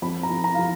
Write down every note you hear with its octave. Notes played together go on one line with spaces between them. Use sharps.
F2 B5
A#5
F2
A#5
F3 F5